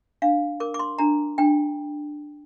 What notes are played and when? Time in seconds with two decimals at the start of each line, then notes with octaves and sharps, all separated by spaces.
0.22 D4 F5
0.60 A#4 D6
0.74 D6
0.79 C6
0.98 D4 A#5
1.38 D4 G5